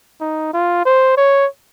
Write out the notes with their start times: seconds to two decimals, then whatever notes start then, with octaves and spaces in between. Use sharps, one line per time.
0.21 D#4
0.53 F4
0.85 C5
1.17 C#5